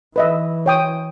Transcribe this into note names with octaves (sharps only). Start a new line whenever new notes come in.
E3 B4 D#5 E5
C#5 G5 D#6